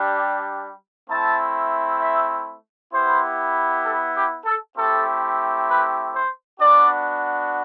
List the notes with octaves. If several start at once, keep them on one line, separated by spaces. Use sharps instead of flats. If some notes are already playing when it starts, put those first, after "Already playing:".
Already playing: G3 D4 G4
A3 C4 E4 A5
E5
B3 E4 G4 C5
A4
G4
A4
A3 C4 E4 G4 A4
B4
C5
B3 D4 F#4 D5